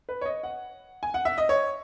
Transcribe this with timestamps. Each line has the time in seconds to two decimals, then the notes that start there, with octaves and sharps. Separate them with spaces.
0.09 B4
0.21 C#5
0.26 D#5
0.43 F#5
1.03 G#5
1.14 F#5
1.25 E5
1.38 D#5
1.49 C#5